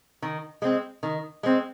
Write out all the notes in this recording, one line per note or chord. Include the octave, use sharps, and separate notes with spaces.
D#3
G#3 C4
D#3
G#3 C4